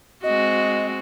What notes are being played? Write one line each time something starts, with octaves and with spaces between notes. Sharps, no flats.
G#3 C4 F#4 D#5